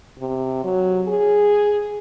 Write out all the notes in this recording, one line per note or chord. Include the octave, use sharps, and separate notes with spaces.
C3
F#3
G#4